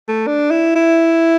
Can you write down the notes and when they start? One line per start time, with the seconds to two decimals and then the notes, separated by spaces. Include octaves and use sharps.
0.09 A3
0.27 D4
0.51 E4
0.75 E4